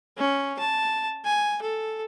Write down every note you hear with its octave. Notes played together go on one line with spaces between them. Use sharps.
C#4
A5
G#5
A4